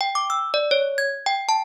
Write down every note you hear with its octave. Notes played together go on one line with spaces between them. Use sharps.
G5
D6
E6
D5
C#5
G#6
G5
A5